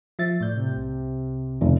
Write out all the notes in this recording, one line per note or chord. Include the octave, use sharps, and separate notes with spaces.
F3 E5 A6
A2 D5 G6
C3
C2
F1